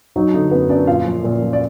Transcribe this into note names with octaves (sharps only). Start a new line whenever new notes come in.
F#3 D#4
D3 D#4
F#2 B3 B4
F#2 D4 D5
A#2 F4 F5
F3
A#2
F3
D5